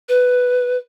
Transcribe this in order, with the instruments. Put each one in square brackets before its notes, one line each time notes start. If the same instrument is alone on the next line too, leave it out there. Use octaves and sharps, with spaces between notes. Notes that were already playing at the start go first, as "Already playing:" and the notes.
[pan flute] B4